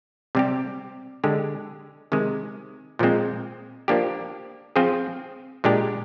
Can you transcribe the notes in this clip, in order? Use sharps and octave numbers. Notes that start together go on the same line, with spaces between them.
C3 G3 C4 G4
D3 G#3 D4 G4
C3 D#3 G#3
A#2 F3 G#3 C4
F3 A#3 D4 G4
F3 C4 F4 G#4
A#2 G#3 D4 G4